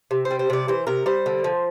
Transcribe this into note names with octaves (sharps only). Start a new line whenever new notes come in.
C3
C5
G3
C5
C3 D5
E3 C5
C3 A#4
G3 C5
D3
F3